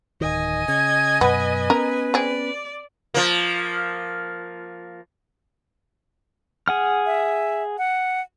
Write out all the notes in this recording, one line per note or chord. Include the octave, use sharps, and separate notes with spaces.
D1 D#3 D#5 G#5
C#3 G#6
F#2 B2 B3 B4
B3 C#4 A#4
C4 G#4 D5
F3 A#3
G#4 F#5 F6
E5
F#5